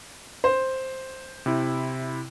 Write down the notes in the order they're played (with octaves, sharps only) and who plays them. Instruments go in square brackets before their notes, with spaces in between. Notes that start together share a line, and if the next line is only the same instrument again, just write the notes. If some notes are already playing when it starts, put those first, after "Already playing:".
[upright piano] C5
[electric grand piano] C3 E4